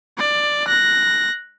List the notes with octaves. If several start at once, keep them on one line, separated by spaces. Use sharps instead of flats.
D5
F#6 A#6